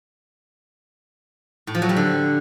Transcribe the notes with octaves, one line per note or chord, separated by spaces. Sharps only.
A2
F3
F#3
G3
D3